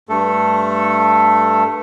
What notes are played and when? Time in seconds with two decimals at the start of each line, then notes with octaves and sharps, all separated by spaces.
0.09 G2 A3 A4